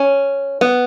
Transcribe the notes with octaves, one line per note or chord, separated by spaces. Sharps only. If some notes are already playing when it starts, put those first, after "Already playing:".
Already playing: C#4
B3